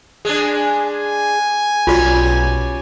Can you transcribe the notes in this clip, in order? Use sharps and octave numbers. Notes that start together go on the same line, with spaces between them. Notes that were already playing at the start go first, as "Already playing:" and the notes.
G#3 D4 G#4
G#5
B1 G3 C#4 F4 F#4